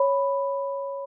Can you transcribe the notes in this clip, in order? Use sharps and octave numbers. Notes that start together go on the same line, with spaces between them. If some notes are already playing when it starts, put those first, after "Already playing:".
Already playing: C#5 B5